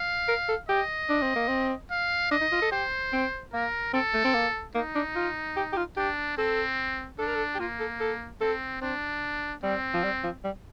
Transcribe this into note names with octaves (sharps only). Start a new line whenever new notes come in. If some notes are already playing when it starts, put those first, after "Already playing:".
Already playing: F5
A#4
A4
G4 D#5
D4
C4
A#3
C4
F5
D4 D#5
D#4
F4
A4
G4 C5
C4
A#3 A#4
C4 A4
A3
C4
A#3
A#3 D#4
D4
F4
G4
G4
F4
D4 G4
C4 A4
D4 A4
A#4
A4
G4
A#3 F4
A4
A4
C4 A4
C4 D4
G3 C4
F3
G3
F3
G3